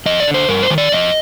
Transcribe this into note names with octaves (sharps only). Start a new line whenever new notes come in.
F2 D#5
D5
D3
C5
G2 A#4
C5
D#3
D5
F2 D#5